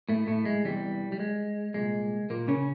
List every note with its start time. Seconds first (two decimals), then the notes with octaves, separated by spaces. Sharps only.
0.09 A2 A3
0.27 A2 A3
0.45 G#3
0.64 E2 C3 E3 G3
1.12 G3
1.19 G#3
1.74 C2 A#2 G#3
2.30 A#2 A#3
2.48 C#3 C#4